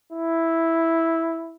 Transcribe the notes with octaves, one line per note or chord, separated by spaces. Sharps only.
E4